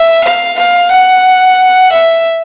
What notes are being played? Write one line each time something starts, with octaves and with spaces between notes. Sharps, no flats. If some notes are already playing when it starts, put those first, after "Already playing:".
Already playing: E5
F5
F5
F#5
E5